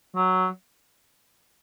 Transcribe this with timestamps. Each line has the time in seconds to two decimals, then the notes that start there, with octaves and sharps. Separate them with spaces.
0.15 F#3